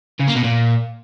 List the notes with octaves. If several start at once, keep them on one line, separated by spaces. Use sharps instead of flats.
C#3
A#3
B2
A#2